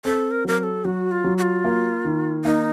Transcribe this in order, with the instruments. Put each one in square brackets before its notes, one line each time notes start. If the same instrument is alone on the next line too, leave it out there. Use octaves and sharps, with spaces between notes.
[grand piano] C4 [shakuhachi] A4
[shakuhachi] A#4
[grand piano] F#3 [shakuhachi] A#4
[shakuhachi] A#4
A4
[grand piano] F#3 [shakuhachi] F#4
[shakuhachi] F4
[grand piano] F#3
[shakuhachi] F#4
F4
[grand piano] A#3
D#3
[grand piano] A#3 [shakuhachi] D#4